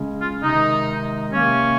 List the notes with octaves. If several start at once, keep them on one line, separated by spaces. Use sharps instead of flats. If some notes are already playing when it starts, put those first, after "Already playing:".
Already playing: C#3 G#3 C#4
F4
C3 D#3 G#3 D#4
C3 D#3 A#3 C#4